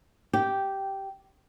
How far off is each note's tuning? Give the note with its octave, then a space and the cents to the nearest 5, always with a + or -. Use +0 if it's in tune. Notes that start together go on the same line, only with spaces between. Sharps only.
G4 -10 G5 +0